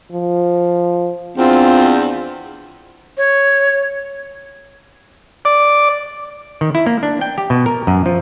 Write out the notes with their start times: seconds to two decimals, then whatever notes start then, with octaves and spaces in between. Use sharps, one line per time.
0.12 F3
1.38 E2 C4 D4 F4
3.17 C#5
5.45 D5
6.61 D#3
6.75 E4
6.87 A#3
7.03 D4
7.21 G5
7.38 G4
7.50 B2
7.66 A#4
7.87 F#2
8.06 F3